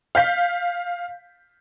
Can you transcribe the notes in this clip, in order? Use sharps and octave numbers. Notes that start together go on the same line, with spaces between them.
F5 G6 B6